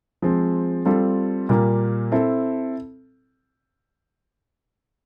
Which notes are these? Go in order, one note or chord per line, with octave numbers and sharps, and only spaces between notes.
F3 G#3 C4
G3 C4 F4 A4
A#2 G3 A#3
C4 E4 A4